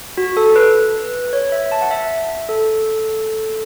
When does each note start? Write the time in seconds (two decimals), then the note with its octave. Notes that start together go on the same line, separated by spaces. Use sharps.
0.18 F#4
0.37 A4
0.56 B4
1.33 C#5
1.52 E5
1.72 A5
1.82 F#5
1.91 E5
2.49 A4